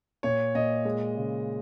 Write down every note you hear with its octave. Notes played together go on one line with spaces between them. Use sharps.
A#2 C#5
A#2 D#5
G#3
C#3